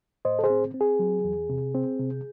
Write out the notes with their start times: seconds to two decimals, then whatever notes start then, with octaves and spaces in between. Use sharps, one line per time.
0.25 A2 C5 D#5
0.39 A4
0.44 G#4 C5
0.50 C4
0.74 C4
0.81 G#4
0.99 F#3
1.24 E2
1.50 C3
1.75 C4
1.99 C3